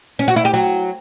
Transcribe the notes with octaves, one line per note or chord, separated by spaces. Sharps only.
C#4
F#4
E4
G4
F#3